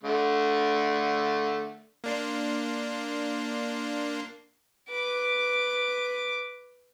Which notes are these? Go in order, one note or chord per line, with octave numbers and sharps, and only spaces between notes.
D3 A3
A#3 D4 C6
B4 D6